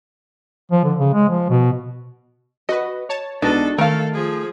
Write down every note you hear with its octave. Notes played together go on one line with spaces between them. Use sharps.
F3
D3
C#3
G#3
F3
B2
F#4 B4 D#5
C#5 A5
B1 G#3 B3 D4 D#4 F#4 A4
D#3 A3 A4 A#4 F5
F3 G#4